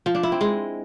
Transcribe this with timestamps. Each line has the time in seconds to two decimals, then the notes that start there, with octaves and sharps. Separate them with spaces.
0.06 F3
0.15 D4
0.23 E4
0.32 C4
0.41 G#3